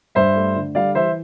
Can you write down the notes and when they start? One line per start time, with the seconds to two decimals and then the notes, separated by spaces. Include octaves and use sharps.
0.15 G2 C5 E5
0.35 A3
0.56 D3
0.75 G3 D5 F5
0.95 E3 C5 E5